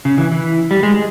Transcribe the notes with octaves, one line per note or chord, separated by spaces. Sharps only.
C#3
E3
E3
G3
G#3